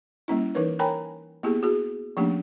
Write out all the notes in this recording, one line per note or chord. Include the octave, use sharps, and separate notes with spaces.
G3 A#3 C#4 E4
E3 D#4 A#4 B4 C#5
A#4 C#5 G5 G#5 A#5 B5
A#3 B3 E4 G4 G#4
F#4 G#4
F3 A3 A#3 C#4 D4 G4